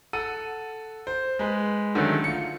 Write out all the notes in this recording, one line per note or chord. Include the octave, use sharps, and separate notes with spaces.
A4 F#5 D#7
C5
G#3 B4
D3 D#3 F#3 A3 C#4
F4 C#7